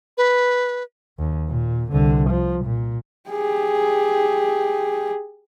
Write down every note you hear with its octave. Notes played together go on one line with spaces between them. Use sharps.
B4
D#2
A#2
C2 D3
F3
A#2
G4 G#4